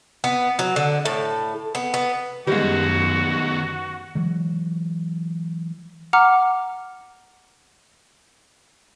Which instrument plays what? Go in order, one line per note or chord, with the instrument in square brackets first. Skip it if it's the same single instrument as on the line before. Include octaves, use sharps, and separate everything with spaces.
[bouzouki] B3
F#3
D3
A2
B3
B3
[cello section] F#2 [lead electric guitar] D#3 B3 [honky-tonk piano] G3 G#3 [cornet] F#4
[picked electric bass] E3 F#3 G#3
[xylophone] F#5 A#5 D6 F6